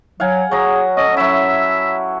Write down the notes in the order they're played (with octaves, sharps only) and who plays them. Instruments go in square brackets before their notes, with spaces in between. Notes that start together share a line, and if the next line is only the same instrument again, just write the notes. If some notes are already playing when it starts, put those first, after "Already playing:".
[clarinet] F#3 [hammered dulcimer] F5 F#5 G#5
[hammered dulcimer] F#3 A#5 [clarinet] G#4
[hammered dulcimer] C#4 A4 [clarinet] D#5
[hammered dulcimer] F#3 E4 [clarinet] E5